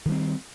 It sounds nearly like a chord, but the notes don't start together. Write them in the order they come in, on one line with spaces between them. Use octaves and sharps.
D#3 G3 C4